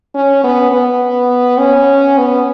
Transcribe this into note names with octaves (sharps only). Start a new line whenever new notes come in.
C#4
B3
B3
C#4
B3